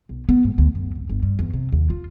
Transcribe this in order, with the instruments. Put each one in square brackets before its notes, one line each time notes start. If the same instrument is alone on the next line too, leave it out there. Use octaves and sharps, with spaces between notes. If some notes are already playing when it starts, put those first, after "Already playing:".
[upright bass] B1
B3
G#2
D2
F#2
G#1
G1
G2
E2
C3
D#2
F4